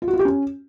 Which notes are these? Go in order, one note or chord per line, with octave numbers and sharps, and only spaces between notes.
F4
F#4
F4
G4
C#4